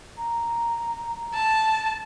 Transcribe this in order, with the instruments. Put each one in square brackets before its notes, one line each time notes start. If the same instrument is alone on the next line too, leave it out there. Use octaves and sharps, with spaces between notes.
[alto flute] A#5
[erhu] A5